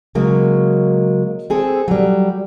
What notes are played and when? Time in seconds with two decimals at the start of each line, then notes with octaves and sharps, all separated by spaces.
0.15 C#3 F#3 G#3 A#3
1.50 C4 G#4 A4
1.88 F#3 G3